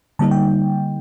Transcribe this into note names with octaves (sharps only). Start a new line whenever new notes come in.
D3 G3 A#3 D#4 A5
G5